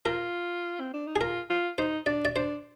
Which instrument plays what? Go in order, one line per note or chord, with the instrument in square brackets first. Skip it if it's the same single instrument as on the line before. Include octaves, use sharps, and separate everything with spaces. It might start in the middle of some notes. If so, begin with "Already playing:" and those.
[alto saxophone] F4 [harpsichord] A#4
[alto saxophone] C4
D4
D#4
[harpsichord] G#4
[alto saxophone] F4 [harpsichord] A#4
[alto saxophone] F4
[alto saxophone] D#4 [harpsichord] C5
[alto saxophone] D4 [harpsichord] D5
[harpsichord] D5
[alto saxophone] D4 [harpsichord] C5